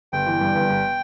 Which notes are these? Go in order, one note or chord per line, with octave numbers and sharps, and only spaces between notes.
G1 G5
E3
G2
G1
G1